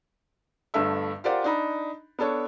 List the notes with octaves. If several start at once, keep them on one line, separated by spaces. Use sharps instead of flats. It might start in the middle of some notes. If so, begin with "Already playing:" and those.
G1 G2 A3 E5 E6
F4 G4 A#4 C5 D5 F#5
D4 D#4 B5
B3 D4 A4 C#5